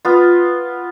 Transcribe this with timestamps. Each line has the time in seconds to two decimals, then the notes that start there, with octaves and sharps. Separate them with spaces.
0.05 B3 F4